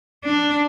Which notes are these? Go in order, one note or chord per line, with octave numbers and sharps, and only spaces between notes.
D4